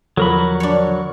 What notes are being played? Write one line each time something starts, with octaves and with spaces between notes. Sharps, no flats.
E2 D3 F3 F#3 A#4 B5 C#6
D4 C#5